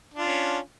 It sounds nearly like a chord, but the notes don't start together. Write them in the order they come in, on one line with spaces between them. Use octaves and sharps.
D4 F4 C#4